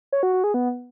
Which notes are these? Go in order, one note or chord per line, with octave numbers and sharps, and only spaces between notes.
C#5
F#4
F#4
G#4
B3